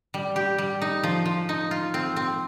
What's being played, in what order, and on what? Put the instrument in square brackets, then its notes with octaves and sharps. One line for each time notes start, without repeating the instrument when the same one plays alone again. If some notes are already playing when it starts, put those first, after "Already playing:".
[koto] G3
G4
G3
D#4
F3
F3
D#4
F4
C4
C4